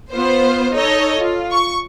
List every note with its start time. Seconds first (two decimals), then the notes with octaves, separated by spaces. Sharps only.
0.13 B3 F4 C5
0.73 D#4 A4 C#5 D#5
1.20 F4
1.51 C#6